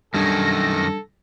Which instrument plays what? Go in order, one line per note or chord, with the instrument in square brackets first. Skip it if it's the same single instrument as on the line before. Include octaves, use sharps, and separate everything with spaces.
[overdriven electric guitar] F#2 D#3 [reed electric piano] G3 D4 G#6 [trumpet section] A4 [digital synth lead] A#6